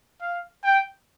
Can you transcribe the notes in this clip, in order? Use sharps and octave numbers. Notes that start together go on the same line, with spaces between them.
F5
G5